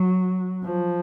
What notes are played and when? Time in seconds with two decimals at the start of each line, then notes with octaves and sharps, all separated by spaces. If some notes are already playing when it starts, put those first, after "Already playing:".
Already playing: F#3
0.65 F3